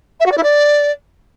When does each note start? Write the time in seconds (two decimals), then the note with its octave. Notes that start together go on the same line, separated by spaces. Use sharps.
0.20 E5
0.26 F#4
0.32 D5
0.37 E4
0.43 D5